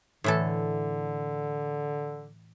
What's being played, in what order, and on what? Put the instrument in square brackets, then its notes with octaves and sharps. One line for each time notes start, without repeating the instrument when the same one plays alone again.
[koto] A2 E3 A4 [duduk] D3